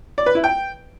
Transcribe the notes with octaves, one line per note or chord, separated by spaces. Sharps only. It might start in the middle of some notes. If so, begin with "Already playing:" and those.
D5
B4
E4
G5